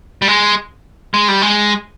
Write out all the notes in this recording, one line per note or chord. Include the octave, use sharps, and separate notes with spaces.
G3
G#3
G#3
G3
G#3